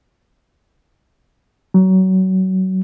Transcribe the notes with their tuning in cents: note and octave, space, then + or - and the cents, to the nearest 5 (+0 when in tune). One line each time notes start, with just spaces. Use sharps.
F#3 +25